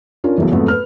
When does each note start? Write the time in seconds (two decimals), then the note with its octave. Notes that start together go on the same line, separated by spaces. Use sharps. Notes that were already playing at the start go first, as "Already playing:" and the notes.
0.24 C#4 D4 F4 A#4
0.38 B1 C#3 E3
0.52 F2 G#2 F#3 A3 B3
0.68 B4 F6